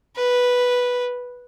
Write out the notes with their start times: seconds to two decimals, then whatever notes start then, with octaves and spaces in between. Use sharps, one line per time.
0.16 B4